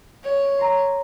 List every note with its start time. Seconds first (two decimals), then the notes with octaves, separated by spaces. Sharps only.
0.24 C#5
0.59 A#5 C6